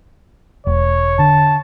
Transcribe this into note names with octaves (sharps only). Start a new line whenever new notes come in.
E1 C#5
D3 A5